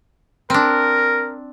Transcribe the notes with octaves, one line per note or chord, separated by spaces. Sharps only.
C4 D4 A#4